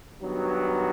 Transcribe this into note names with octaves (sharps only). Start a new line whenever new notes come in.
G2 D#3 F#3 B3